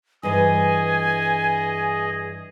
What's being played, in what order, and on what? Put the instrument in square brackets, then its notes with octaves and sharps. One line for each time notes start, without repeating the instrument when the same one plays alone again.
[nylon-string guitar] G2 E3 C5 [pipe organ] G#4 D#5 [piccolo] G#5